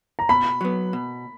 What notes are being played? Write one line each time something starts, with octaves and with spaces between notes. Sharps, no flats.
A#5
B2 B5
F#3 B3
B2